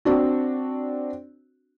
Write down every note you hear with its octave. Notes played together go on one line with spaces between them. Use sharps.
C4 D4 F#4